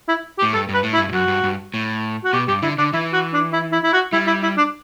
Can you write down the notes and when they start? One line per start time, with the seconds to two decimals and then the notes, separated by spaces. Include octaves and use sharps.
0.08 E4
0.38 G4
0.43 A2
0.53 G2 A4
0.69 G2
0.74 B4
0.83 A2
0.94 E4
0.98 G2
1.09 G2
1.13 F#2 F#4
1.28 G2
1.44 G2
1.74 A2
2.24 F#4
2.33 B2 G4
2.48 G2 G4
2.62 D3 E4
2.78 D3 D4
2.93 E3 E4
3.13 F#4
3.33 D4
3.53 E4
3.72 E4
3.84 E4
3.93 F#4
4.13 G3 E4
4.27 E4
4.43 E4
4.57 D4